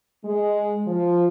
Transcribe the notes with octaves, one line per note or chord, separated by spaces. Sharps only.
G#3
F3